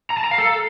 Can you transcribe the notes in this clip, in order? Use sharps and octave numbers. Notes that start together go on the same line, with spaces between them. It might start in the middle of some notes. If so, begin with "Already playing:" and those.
A#5
A5
A#5
F5
A4